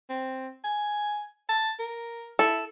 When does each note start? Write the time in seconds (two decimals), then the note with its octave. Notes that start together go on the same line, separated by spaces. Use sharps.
0.10 C4
0.64 G#5
1.49 A5
1.80 A#4
2.39 E4 A4